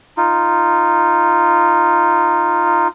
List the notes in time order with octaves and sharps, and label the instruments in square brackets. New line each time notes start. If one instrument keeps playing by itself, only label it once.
[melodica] D#4 F4